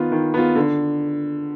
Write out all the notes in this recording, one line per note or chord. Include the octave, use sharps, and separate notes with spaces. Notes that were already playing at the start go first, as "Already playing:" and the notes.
Already playing: D#3 B3 F4
D#3
B3 F4
D3